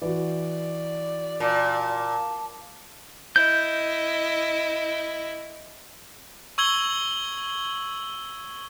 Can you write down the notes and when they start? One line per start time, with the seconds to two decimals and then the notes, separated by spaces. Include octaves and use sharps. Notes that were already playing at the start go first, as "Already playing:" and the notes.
0.02 E3 F#4 D5
1.40 A#2 A5
3.36 E4 D#5 G6
6.58 C#6 E6 G#6 F#7 G7